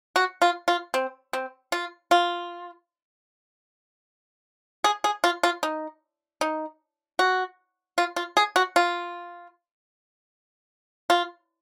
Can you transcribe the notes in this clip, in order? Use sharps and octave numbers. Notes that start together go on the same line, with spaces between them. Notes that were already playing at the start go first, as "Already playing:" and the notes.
F#4
F4
F4
C4
C4
F4
F4
G#4
G#4
F4
F4
D#4
D#4
F#4
F4
F4
G#4
F#4
F4
F4